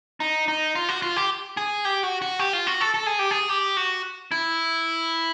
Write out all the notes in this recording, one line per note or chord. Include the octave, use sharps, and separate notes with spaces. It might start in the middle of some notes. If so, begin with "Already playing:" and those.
D#4
D#4
F4
F#4
F4
G4
G#4
G4
F#4
F#4
G4
F4
F#4
A4
A4
G#4
G4
G#4
G4
F#4
E4